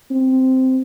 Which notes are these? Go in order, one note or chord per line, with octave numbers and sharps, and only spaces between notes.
C4